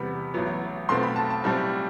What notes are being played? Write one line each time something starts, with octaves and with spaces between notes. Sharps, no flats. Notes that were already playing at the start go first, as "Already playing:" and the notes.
Already playing: E2 C3 G3 B3 B5
A1 A2 F#3 B3
B1 B2 A3 C4 C6
B5
A5
A5
B1 A2 G3 C4 A5